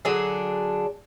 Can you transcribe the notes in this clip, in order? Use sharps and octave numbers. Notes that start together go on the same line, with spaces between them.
D3 F#3 D4 G#4